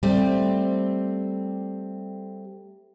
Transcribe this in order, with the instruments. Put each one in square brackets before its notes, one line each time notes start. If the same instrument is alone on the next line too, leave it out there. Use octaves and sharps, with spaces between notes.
[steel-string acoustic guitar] G3 A3 C4